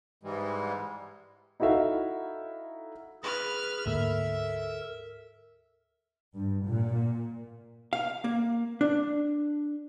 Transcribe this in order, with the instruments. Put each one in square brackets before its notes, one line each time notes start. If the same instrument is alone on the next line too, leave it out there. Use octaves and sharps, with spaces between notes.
[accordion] G#2 E3 G3 G#3
[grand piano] D#4 E4 F#4 A4 E5 F5
[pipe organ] G#4 [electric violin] B4 F6
[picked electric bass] D2 G#2 A#3 [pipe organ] A4 A#4 [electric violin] E5
[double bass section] G2
A#2
[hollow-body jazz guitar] F5
A#3
D4